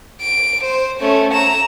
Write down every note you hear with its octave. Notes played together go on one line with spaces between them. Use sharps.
D7
C5
A3 C#4
A#5 E7